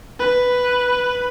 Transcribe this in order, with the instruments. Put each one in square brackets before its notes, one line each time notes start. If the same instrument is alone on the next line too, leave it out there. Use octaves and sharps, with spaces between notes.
[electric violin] B4